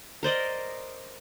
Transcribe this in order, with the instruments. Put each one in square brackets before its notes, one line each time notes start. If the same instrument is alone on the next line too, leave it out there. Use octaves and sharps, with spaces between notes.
[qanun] A#4 C5 D5 D#5